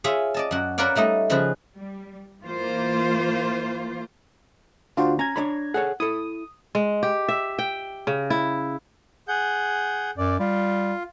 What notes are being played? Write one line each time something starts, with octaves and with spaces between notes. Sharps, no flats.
F4 G#4 C#5 E5 F5
D5 D#5 A5
F#2 F#4
F#4 A#4 B4 C#5 D5 F5
G3 A3 D#4 D#5
C#3 F3 F4 G#4 B4
G3
E3 A#3 F4 C5
D2 D4 F4 F#4 C5
C#4 A#5 G#6
D4 C#5 B5
G#4 A4 C#5 F#5
E4 A4 D#6
G#3
G4
E5
G5
C#3
E4
G#4 F#5 G6
F#2 D5
G3 F4